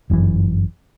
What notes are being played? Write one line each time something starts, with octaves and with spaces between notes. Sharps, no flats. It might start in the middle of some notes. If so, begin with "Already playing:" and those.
G1 F#2 C#3 E3